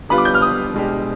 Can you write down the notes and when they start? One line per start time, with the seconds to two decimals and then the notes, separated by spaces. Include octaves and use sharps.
0.09 D3 G3 B3 F4 B4 B5
0.18 D6
0.25 G6
0.34 F6
0.42 D#6
0.74 B2 G#3 D4 G4